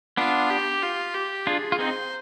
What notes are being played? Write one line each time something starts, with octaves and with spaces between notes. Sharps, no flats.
B3 D4 F4
G4
F4
G4
D4 F4 G#4
F4
C4 D#4 C5